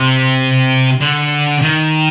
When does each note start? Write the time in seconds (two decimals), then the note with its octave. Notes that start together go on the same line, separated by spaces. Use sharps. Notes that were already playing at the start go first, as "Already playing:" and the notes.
Already playing: C3
1.01 D3
1.62 D#3